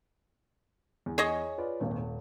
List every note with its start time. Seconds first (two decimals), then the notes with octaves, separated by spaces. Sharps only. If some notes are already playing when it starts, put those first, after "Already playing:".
1.06 E2
1.18 G#4 C#5 D#5
1.58 F4 B4 D5
1.80 D#1 G#1 A#2
1.98 D#1